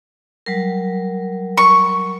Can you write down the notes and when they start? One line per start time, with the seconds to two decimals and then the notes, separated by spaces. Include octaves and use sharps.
0.46 F#3 G3 A#4
1.58 C#6